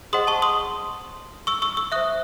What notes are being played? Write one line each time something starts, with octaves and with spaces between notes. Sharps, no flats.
G#4 C5 D#5 F#5 C6 D#6
A5 C#6
C6 D#6
C#6 E6
C#6 E6
C#6 E6
C5 E5 D#6 F#6